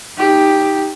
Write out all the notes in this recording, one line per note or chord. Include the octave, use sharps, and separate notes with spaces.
D#4 G4